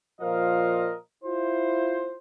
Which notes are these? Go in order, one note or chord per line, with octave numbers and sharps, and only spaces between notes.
A#2 F3 A#4 D#5 F5
E4 F4 C5